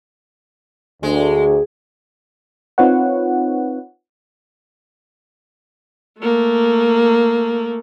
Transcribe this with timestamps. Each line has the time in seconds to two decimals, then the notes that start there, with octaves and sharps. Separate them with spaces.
1.03 D2 G#3
2.78 C4 D#4 F4 B4 C#5 F#5
6.19 A3 A#3